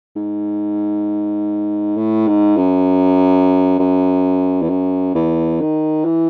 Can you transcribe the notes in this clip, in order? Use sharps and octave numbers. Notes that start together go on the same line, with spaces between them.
G#2
A2
G#2
F#2
F#2
E2
F#2
E2
D#3
E3